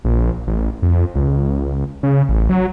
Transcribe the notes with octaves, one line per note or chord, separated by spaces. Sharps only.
A#1
A1
F2
C#2
C#3
A1
F#3